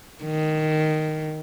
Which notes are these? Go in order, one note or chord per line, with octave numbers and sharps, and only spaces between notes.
D#3